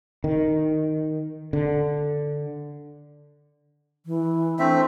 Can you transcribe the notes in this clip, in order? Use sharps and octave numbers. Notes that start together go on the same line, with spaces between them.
D#3
D3
E3
A3 C4 D4 E5